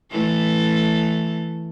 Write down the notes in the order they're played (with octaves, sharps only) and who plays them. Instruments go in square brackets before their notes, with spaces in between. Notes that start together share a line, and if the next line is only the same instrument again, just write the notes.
[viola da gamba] E3 A3 A4